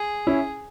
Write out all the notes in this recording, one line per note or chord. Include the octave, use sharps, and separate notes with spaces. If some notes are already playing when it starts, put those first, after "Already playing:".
Already playing: G#4
C#4 E4